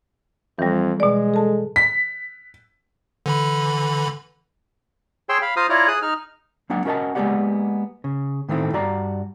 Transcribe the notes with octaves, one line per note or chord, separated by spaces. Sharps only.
F2 E3 G3
B2 G#3 D5
A4 A5
B6
D3 E3 B5
G#4 C#5 G5 C6 E6
F5 B5
F4 C5 F5 A#5 D#6 F6
E4 F4 C#5 D5 A#5
G#4 D#6 F#6
D#4 F6
F#3 A#3 D4 F#5
C#4 F#4 A#4 D#5 F#5 A5
G#3 A#3 B3 G4 D5 F#5
C#3
A2 D#3 E3 A3 C4
G2 F#4 D5 A#5